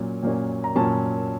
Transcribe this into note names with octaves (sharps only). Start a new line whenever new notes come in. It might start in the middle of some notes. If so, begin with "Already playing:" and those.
Already playing: A#2 F#3 A#3 C#4
A#2 F#3 A#3 C#4
A#5
A#2 F#3 A#3 C#4 A5